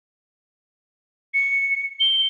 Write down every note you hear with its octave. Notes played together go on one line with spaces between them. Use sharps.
C#7
G7